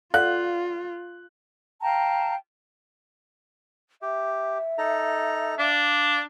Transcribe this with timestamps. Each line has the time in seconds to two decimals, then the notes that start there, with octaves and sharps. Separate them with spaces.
0.14 F4 A4 D5 F5 F#5 F#6
1.81 F5 G5 A5 A#5
4.02 G4 E5
4.78 D#4 A4 A#5
5.59 D4 D5 F5